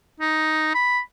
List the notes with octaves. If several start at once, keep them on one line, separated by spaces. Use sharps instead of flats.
D#4
B5